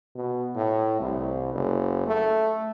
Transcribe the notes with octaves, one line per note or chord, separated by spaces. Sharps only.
B2
A2
C2
F#1
A3